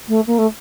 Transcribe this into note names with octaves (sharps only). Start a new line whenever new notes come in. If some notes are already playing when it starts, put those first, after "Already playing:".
A3
A#3
A3